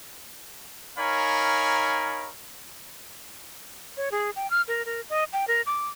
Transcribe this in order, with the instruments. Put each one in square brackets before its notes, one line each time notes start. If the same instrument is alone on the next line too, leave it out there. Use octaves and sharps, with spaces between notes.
[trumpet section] D#4 A#4 C#5 F5 G#5 B5
[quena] C#5
G#4
G5
F6
A#4
A#4
D#5
G5
A#4
D6